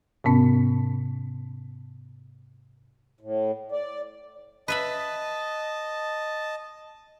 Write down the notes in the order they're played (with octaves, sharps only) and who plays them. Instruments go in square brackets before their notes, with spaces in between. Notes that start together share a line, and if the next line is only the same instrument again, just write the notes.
[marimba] G#2 C3 B3 C#4
[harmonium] A2
D5
[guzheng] B4 E5 B5 [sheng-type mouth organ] D#5 A5